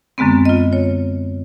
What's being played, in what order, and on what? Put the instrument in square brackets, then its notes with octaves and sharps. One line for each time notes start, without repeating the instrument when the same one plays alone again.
[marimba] F#2 D3 G#3 B3 C4
F4 D#5
C#5